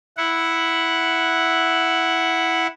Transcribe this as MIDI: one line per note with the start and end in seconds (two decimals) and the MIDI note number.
0.17 2.67 64
0.17 2.67 78